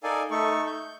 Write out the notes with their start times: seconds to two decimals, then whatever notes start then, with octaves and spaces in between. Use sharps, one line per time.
0.03 D#4 A4 A#4 D5 F5 G#5
0.31 A3 D#4 A4 C#6
0.67 G6